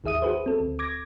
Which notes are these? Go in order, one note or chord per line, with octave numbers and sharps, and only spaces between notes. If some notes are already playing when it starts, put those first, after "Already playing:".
G#1 D#2 G#4 E5 D#6 D#7
F#4 G#4 B4 C5
C4 A4
D2
D6 G#6 A#6